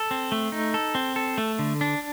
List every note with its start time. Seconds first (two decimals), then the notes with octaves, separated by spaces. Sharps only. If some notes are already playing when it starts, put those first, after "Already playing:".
Already playing: A4
0.11 C4
0.32 A3
0.52 D#4
0.74 A4
0.95 C4
1.16 A4
1.38 A3
1.59 D3
1.81 D4